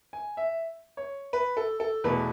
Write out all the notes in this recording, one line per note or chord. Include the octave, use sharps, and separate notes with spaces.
G#5
E5
C#5
B4
A4
A4
E2 B2 A3 B4